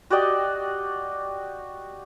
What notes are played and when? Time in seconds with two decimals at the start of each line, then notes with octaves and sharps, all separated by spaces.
0.10 F#4 G4 D5 D#5